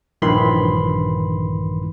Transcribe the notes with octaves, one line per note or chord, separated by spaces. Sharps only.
A#1 G2 D#3 E3 B5 C6